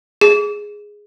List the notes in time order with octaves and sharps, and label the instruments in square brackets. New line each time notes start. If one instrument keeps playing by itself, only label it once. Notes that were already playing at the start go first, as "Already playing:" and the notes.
[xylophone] G#4